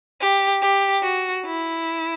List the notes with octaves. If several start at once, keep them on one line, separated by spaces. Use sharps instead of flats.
G4
G4
F#4
E4